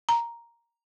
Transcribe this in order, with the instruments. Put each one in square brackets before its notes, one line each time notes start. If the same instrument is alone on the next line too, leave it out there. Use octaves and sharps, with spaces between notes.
[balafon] A#5